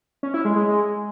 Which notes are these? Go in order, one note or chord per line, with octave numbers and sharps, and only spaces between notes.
C#4
E4
G#3
G#3